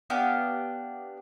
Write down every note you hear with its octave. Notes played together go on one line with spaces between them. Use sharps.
B3 D4 G4 F5